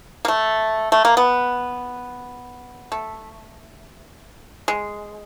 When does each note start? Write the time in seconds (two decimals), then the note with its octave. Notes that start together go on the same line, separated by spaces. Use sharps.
0.25 A#3
0.28 A3
0.92 A3
1.05 A#3
1.17 B3
2.92 A3
4.68 G#3